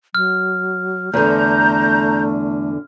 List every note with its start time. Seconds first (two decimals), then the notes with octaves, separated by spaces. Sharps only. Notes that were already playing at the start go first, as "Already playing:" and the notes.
0.15 F#3 F6
1.13 E2 D3 A3 A#5 G6